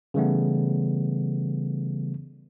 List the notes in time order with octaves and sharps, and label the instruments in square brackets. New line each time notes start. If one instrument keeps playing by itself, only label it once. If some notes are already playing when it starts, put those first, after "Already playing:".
[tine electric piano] C#3 E3 G3 A3 B3